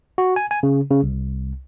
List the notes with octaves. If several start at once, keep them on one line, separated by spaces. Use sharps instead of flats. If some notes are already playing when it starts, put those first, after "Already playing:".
F#4
G#5
G#5
C#3
C#3
C2